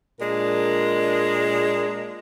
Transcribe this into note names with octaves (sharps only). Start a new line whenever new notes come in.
A#2 G#3 D4 A#4